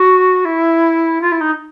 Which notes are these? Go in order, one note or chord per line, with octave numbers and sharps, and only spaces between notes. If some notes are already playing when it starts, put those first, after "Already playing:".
Already playing: F#4
E4
F4
E4
D#4